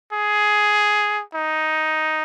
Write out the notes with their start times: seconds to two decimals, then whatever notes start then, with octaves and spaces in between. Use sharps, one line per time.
0.13 G#4
1.34 D#4